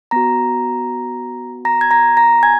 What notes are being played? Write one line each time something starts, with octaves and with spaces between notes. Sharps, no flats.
B3 F#4 A#5 A#6
A#5 A#6
G#6
A#5 A#6
A#5 A#6
G#5 G#6